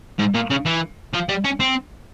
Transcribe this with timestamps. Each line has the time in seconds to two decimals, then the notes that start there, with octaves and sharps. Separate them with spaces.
0.19 G#2
0.35 A#2
0.50 C#3
0.66 E3
1.14 F3
1.29 G3
1.45 C#4
1.60 C4